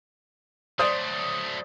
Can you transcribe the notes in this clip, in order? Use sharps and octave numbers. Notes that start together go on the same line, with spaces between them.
F#3 A3 C5 D5 D#6